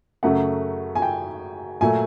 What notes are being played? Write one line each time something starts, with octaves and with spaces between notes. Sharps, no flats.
F#2 C#3 F#3 A3 F#5
G#5
G5
A#2 F#3 A3 G#5